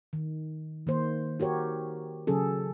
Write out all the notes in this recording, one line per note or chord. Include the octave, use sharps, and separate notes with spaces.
D#3
D#3 A#3 C5
F#4 G4 A#4 C#5
C#3 F#3 C#4 G#4 A4